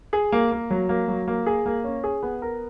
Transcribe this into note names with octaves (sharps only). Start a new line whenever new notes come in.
G#4
A#3
A#3
F#3
A#3
F#3
A#3
G#4
A#3
C#4
G#4
B3
A#4